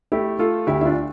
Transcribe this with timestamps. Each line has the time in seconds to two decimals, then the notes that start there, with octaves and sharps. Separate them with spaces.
0.12 A3 E4 G4
0.39 A3 F4 A4
0.67 D2 E4 G4
0.81 E4
0.85 D4 F4